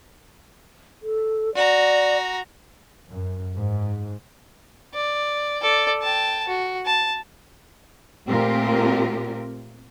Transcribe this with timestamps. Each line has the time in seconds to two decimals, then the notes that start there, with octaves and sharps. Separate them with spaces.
1.02 A4
1.55 F#4 D5 A#5
3.11 F#2
3.55 G#2
4.94 D5
5.62 A4 D5
6.02 G5 A5
6.48 F#4
6.86 A5
8.26 A#2 A3 C4 F4 G4 A#4